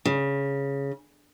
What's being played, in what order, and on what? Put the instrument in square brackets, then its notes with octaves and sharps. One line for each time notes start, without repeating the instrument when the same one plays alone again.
[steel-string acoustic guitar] C#3